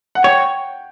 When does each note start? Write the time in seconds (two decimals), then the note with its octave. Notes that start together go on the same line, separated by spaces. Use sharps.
0.15 F#5
0.24 C#5 G5